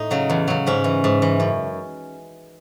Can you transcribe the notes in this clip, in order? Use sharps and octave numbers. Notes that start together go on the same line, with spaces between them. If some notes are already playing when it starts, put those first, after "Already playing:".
Already playing: A2 D#4
C#3 F#3
E2
C#3 F#3
G#2 C#4
E3
G#2
E3
F#2